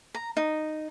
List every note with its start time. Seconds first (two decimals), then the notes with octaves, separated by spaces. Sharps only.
0.15 A#5
0.37 D#4